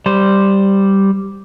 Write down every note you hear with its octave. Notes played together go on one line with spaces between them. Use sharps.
G3 C5